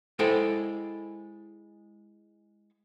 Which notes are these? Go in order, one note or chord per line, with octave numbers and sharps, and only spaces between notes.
G#3 E4 A4 C5 G5